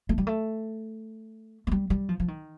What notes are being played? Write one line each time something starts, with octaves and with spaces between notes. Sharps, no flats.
A3
G3
A3
A3
G3
G3
F3
F3
D#3